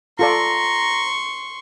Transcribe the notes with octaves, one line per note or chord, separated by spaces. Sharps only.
F4 A4 D5 A#5 C6 C#6